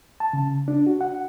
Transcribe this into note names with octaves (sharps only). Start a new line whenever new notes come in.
A5
C#3
D4
F#4
F#5